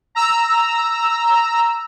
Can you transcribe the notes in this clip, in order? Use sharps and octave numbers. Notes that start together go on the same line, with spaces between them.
A#5 E6